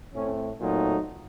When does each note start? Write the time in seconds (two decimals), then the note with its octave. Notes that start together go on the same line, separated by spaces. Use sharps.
0.15 A2 A3 C4 C#4
0.60 A#2 F#3 A3 C4 D#4